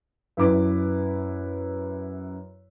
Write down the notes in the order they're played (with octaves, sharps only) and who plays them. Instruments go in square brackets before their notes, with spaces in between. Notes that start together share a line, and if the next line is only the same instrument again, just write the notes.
[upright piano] F#2 E4 B4 D6